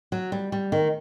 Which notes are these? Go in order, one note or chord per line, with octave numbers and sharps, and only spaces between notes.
F#3
G3
G3
D#3